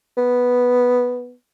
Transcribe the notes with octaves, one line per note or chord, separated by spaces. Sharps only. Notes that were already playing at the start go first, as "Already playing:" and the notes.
B3